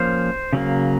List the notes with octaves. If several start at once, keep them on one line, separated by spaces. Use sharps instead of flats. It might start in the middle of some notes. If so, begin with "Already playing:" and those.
Already playing: F3 A#3 C#4 C5
C#3 F#3 A#3